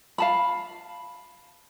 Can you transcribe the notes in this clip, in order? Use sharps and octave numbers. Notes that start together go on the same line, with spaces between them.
F5 A5 B5